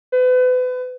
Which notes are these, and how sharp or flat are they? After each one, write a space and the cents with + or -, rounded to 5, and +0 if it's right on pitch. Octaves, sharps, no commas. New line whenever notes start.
B4 +35